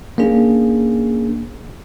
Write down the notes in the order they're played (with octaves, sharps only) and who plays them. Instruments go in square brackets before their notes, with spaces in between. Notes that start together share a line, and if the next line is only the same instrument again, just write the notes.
[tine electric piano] A#3 C#4 D4 G#4